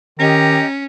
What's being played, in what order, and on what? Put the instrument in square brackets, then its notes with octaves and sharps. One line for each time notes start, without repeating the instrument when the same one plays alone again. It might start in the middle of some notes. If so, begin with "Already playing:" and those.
[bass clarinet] D#3 [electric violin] C#4 [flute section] G4 D#5 [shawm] A#5